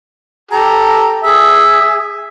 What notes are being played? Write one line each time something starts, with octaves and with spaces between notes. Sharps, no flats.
G4 A4 A#5
G#4 E5